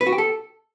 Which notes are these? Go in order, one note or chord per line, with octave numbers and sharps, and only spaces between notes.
B4
F#4
G4
A4